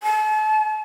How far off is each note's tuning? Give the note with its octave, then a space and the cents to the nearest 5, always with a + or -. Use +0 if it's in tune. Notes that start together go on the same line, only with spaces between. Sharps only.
A5 -45